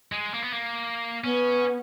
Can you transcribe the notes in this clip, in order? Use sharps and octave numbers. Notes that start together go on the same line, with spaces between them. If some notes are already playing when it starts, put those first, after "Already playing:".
G#3
A#3
B3
A#3
B3 C#4